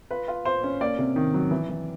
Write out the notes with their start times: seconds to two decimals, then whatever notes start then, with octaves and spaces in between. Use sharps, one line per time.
0.11 F4 B4
0.28 F4
0.45 F4 C5
0.64 C#4
0.81 A#3 D5
0.98 C3
1.16 D#3
1.34 F#3
1.51 E3
1.69 E3